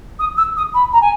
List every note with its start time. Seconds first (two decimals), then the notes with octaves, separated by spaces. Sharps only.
0.19 D#6
0.37 E6
0.56 D#6
0.74 B5
0.92 A#5
1.01 G#5